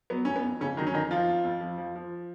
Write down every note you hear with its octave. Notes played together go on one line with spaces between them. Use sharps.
F#3 B3
F2 C#4
B3
F2
F2 C#3 C#4
D#3 F#3 D#4
C#4
F2 D#3 D#4
F3 F4
F2
F2
F3
F3
F3